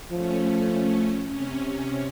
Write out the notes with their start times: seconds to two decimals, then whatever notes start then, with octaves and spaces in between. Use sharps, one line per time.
0.11 F3 A3 C#4
1.27 C3 C#4